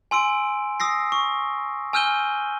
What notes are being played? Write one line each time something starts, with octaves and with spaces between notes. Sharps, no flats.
G#5 C6 E6 D7
D#6 E6 A#6 C7
C#6
G#5 E6 F6 G6 D#7 G7